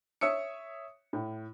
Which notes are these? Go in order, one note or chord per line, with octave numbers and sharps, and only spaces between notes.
C#5 E5 D#6 E6 C#7
A2